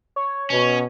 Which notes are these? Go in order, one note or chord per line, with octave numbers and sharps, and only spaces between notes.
C#5
B2 C#4